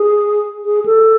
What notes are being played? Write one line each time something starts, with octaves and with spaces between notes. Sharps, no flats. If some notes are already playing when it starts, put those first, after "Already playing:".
Already playing: G#4
G#4
A4